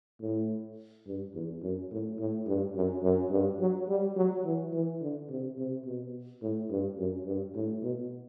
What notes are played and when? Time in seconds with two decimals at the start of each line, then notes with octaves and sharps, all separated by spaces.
0.21 A2
1.06 G2
1.34 E2
1.63 F#2
1.91 A2
2.19 A2
2.47 G2
2.75 F#2
3.03 F#2
3.31 G2
3.59 F#3
3.88 G3
4.16 F#3
4.45 E3
4.73 E3
5.01 D3
5.29 C3
5.58 C3
5.85 B2
6.42 A2
6.70 G2
6.98 F#2
7.26 G2
7.55 A2
7.82 B2